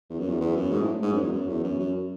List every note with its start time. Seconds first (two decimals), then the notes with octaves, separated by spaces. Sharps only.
0.10 E2
0.19 F#2
0.28 E2
0.41 E2
0.56 F#2
0.71 G#2
0.82 A2
1.02 G#2
1.12 F#2
1.22 E2
1.33 F#2
1.49 E2
1.64 F#2
1.79 F#2